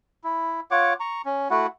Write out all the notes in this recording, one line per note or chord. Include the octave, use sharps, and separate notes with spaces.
E4
F4 C#5 F#5 D6
A#5 C#6
C#4
A3 E4 F#4 F#5